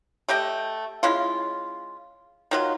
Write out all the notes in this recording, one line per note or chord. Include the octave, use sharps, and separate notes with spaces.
A3 G4 D#5 G5
G#3 C#4 E4 F4
D#3 F#3 F4